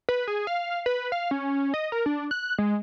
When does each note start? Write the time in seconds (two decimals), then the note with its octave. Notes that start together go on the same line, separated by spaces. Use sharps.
0.09 B4
0.28 G#4
0.47 F5
0.86 B4
1.12 F5
1.31 C#4
1.74 D#5
1.92 A#4
2.06 D4
2.31 F#6
2.58 G#3